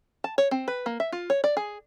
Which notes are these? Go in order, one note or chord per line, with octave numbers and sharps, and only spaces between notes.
A5
C#5
C4
B4
A#3
E5
F4
C#5
D5
G#4